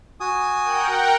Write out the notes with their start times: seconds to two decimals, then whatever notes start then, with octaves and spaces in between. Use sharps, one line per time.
0.20 F#4 G#5 D#6
0.64 A#4 F#5 G5